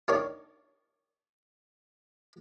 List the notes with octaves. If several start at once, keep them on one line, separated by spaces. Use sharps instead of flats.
D4 D#4 G4 A#4 C#5 D5